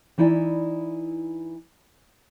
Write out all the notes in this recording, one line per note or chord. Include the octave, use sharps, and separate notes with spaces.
E3 D#4 E4 D5 G#5